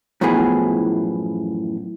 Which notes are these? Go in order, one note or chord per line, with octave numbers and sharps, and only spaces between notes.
F#2 A2 E3 F3 B3 G#4